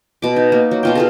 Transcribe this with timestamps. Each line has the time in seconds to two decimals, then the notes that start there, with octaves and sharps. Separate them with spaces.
0.22 B2 D6
0.36 D#4
0.52 A#3
0.71 F#3
0.83 B2 F4 G5
0.95 F4 G#4 A4